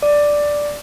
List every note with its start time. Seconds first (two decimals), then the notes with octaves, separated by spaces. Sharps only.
0.02 D5